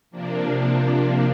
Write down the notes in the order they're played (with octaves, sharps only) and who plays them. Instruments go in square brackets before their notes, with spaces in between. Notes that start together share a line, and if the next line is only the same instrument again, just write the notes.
[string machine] C3 F3 A#3 D4